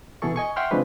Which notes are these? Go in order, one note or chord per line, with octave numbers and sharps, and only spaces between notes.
B2 E3 G#4 A4 C#6
D#5 G#5 C#6
E5 F#5 G5 C6 C#6 F6
C#3 F3 G#3 C4 D4 B4